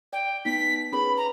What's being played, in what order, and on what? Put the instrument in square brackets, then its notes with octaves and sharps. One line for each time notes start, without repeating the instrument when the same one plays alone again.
[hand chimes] D5 [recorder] G5
[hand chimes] B3 D#4 [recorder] B6
[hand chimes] C#4 G#4 B4 [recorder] B5
[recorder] A#5